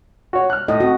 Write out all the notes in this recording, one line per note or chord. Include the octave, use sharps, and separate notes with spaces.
F#4 C#5
F6 F#6
A2 D#5
C4 F#4